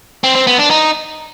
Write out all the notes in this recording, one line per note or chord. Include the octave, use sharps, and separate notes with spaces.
C4
C4
B3
D4
D#4